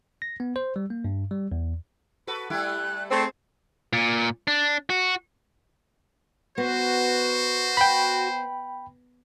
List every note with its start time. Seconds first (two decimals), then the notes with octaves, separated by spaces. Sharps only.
0.22 A#6
0.40 B3
0.56 C5
0.76 G3
0.90 A#3
1.05 G2
1.31 G3
1.52 E2
2.27 F#4 A4 B4 B5
2.50 G3 A3 E4 F#6
3.11 A3 C4 G#4 C5 D5
3.93 A#2
4.48 D4
4.90 F#4
6.58 B3 F#4 C5
7.77 G5 B5